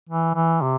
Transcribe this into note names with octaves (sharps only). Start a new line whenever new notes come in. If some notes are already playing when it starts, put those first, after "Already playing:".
E3
E3
C3